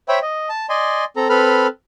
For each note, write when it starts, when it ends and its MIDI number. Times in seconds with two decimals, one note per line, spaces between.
0.08 0.19 72
0.08 0.19 73
0.08 0.19 76
0.08 0.19 79
0.08 0.19 83
0.22 0.49 75
0.49 0.66 81
0.69 1.04 74
0.69 1.04 75
0.69 1.04 80
0.69 1.04 84
1.16 1.28 60
1.16 1.28 69
1.16 1.28 82
1.29 1.67 60
1.29 1.67 69
1.29 1.67 71
1.29 1.67 83
1.29 1.67 89